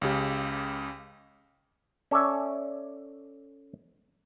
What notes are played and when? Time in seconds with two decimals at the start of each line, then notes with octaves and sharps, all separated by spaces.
0.01 C#2 C#3 G4
2.11 C#4 A4 C#5 D5 E5